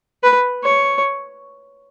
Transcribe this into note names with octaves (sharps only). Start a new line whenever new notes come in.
B4
C#5